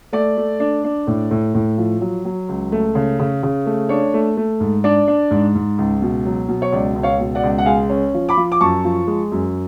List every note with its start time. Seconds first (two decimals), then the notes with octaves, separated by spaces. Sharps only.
0.13 A3 D5
0.37 A3
0.60 D4
0.84 D4
1.07 A2
1.31 A2
1.55 A2
1.78 F3
2.01 F#3
2.25 F#3
2.49 C#2
2.72 A3
2.95 C#3
3.19 C#3
3.43 C#3
3.66 A3
3.89 D4 C#5
4.14 A3
4.37 A3
4.60 G#2
4.84 D4 D5
5.08 D4
5.31 G#2
5.55 G#2
5.78 C#2
6.02 B2
6.26 F#3
6.48 B2
6.62 C#5
6.72 C#2 D5
6.96 C#2
7.03 C#5 F5
7.19 B2
7.35 D5 F#5
7.44 C#2
7.58 F#5
7.66 G#3 F5 G#5
7.90 C#4
8.14 F3
8.29 B5 D6
8.37 F3
8.52 D6
8.61 F#2 A5 C#6
8.85 F3
9.07 G#3
9.32 F#2